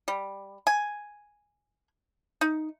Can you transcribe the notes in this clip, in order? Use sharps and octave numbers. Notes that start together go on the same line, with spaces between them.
G3
G#5
D#4